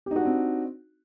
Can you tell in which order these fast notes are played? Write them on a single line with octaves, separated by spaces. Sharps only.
G4 D#4 F#4 D4 C4